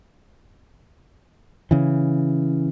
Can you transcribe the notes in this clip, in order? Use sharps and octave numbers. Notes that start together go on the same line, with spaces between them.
C#3 E3